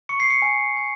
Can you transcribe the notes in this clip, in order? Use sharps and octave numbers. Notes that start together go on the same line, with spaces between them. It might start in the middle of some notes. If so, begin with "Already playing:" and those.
C#6 C#7
C7
C#7
G#5
G#5